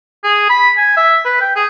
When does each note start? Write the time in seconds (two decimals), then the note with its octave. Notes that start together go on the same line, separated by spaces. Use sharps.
0.24 G#4
0.49 B5
0.77 G#5
0.97 E5
1.25 B4
1.41 G5
1.56 G#4